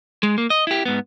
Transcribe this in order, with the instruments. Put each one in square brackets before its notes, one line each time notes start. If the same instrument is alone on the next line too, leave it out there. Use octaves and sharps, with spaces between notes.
[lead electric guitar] G#3
A#3
D#5
E4 G4
G#2 B3